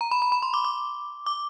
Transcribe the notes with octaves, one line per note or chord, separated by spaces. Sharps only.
A#5
B5
B5
B5
C6
D6
D6
D6